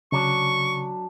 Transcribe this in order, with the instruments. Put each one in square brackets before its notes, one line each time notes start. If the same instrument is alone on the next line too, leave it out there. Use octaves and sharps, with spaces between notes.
[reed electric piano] C#3 [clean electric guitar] F#3 D4 [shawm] C#6